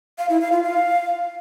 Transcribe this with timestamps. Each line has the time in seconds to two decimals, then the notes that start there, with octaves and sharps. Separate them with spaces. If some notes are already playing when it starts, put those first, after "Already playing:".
0.18 F5
0.30 E4
0.41 F5
0.52 F4
0.63 F5